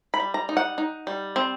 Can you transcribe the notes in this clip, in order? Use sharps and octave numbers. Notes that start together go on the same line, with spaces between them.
B5
G3
A#5
D#4
F#5
D#4
G3
C4